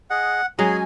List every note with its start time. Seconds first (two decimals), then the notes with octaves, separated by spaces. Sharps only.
0.10 G#4 D#5 F#5
0.59 F#3 G#3 C#4 G#4 G#5